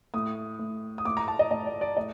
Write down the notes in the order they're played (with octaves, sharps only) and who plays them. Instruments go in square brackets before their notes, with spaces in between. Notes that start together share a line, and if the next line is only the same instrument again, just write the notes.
[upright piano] A2 D#6
A2
D#6
A2 D6
A#5
A5
D#5
A2 D#5
D5
D5
A2 D#5